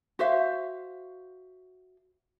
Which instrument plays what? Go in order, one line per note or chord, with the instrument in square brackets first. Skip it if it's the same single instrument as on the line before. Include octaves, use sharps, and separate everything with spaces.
[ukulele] F#4 C5 E5 F5